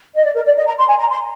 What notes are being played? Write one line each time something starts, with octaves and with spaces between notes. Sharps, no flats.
D#5
D5
A#4
D5
D#5
A#5
C6
G#5
A#5
C6